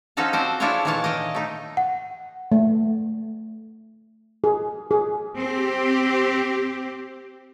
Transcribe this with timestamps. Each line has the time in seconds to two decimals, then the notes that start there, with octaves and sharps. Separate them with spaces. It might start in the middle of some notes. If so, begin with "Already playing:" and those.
0.17 F3 C#4 D#4 F#4 A4 F5
0.33 C4 C5 D5
0.60 D4 E4 F4 G#4 A4 C#5
0.85 A#2 D#3 E3 C#5 F5 A5
1.04 D#5 G5
1.35 A3 D#4
1.77 F#5
2.52 A3
4.44 G#4
4.91 G#4
5.39 C4 G4